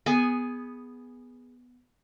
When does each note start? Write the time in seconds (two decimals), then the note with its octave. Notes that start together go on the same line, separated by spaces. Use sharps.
0.06 B3 G#4 G#5